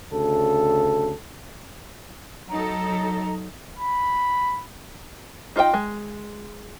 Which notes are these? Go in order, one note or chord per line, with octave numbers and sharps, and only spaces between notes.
D2 C#3 A4
F#3 D#4 A4 A#5
B5
D#4 F4 D#5 E5 G5
G#3